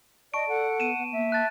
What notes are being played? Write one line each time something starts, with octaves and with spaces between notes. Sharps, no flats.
D5 D#5 A5 C#6 D7
A4 F#5
B3 D#7 E7
B3
A#3 E5
A5 F#6 A6